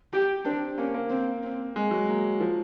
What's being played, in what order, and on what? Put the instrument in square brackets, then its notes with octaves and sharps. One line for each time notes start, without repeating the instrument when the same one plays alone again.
[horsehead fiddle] G4
[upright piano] C4 [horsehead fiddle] D4
[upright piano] A#3 [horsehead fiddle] C#4
[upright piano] A#3
[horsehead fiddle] C4
C4
[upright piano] G#3
F#3
[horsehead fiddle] A#3
[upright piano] F3